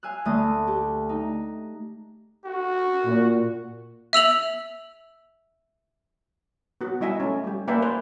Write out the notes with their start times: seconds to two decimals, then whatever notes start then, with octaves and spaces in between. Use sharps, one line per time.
0.03 F5 G#5 E6 F#6
0.25 D2 A3 D#6
0.67 G4
1.09 D#4
2.45 F#4
3.06 A#2
4.13 E5 E6 F7 F#7
6.81 B3 F#4
7.01 G3 E4 D#5 E5 G#5
7.20 A3 C#4
7.44 G3 G4
7.68 A#3 B4 D5 E5 G5 G#5
7.83 C5